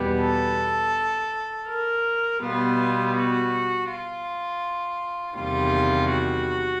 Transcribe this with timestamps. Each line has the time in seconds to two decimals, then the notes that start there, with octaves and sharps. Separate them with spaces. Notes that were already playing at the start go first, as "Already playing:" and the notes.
Already playing: E2 B2 G3 B3
0.21 A4
1.68 A#4
2.41 B2 G3 B3 F4
3.15 F#4
3.89 F4
5.36 E2 C3 D#3 G3 F4
6.10 F#4